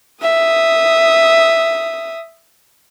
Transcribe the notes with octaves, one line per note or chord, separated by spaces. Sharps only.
E5 D#6